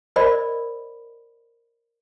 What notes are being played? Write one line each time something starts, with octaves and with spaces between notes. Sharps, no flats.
A#4 C5 D5 D#5 B5